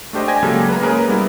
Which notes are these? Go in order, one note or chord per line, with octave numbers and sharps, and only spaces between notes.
A3 D4 G4 C5 D#5
D5 G5 G#5 G#6 A#6
C#3 F#3 G#3 A#3 G4 A4
B4 A#5
G#3 A#3 C#4 G#4 A#4 B4
G3 B3 E4